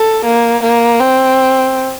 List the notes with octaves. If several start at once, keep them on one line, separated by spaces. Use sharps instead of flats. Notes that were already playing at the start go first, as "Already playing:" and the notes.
Already playing: A4
A#3
A#3
C4